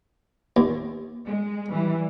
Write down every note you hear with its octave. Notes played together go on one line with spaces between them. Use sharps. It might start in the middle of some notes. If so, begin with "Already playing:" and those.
D#2
G#3
E3 G3